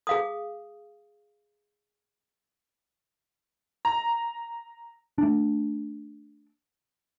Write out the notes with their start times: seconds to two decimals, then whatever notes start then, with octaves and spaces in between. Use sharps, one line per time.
0.07 G#4 F5 D#6
3.85 A#5
5.18 A3 D4